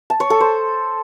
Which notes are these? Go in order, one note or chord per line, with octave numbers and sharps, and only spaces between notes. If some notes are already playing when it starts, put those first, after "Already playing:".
A5
C#5
A4
C5